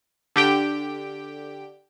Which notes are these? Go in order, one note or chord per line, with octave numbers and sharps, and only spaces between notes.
D3 G4 G5